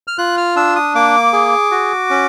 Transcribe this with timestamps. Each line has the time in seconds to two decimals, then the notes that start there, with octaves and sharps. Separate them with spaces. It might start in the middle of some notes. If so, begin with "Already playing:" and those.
0.08 F6
0.18 F4 F#6
0.38 F6
0.56 D4 E6
0.76 D#6
0.95 A#3 D6
1.33 G#4
1.71 F#4
2.10 C#4